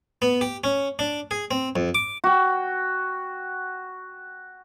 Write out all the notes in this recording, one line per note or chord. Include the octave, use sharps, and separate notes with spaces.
B3
G4
C#4
D4
G#4
C4
F2
D6
F#4 G5